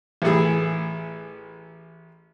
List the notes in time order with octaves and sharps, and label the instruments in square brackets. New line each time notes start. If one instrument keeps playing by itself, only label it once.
[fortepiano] A1 A2 E3 G#4